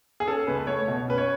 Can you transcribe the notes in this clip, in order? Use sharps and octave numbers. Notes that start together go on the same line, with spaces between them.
G#4
C#4 A4
C#2 B4
A3 C#5
B2
C#4 B4
C#5